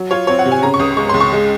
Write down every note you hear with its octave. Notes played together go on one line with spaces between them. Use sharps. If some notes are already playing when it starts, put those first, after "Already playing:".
Already playing: F#3
F4 C#5
C4 C#5
F#5
C3
G#5
C#3 A#5
C#6
C#2 D#6
G#3 C#6
C6
C#2
C#6
G#3